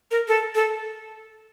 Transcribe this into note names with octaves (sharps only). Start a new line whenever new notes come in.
A#4
A4
A4